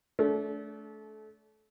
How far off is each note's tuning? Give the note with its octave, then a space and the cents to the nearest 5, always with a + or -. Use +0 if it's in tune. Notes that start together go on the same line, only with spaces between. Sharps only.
A3 -30 D4 -45